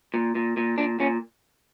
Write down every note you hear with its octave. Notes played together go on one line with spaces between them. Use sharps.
A#2
A#2
A#2
A#2 D4
A#2 C#4